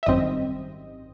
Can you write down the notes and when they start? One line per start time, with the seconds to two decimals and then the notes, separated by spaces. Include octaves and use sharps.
0.03 E5
0.06 G#1 F#2 D#3 G3 C4 D#5